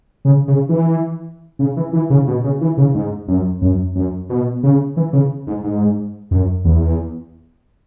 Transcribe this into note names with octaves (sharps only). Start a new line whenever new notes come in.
C#3
C#3
E3
C#3
E3
E3
C#3
B2
C#3
E3
C#3
G#2
F#2
F#2
F#2
B2
C#3
E3
C#3
G#2
G#2
F#2
E2